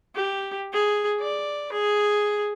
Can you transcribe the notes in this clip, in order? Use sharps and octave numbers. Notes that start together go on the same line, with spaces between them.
G4
G#4
D5
G#4